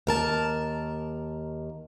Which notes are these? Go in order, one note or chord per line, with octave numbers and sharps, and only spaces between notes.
D#2 A#4 A5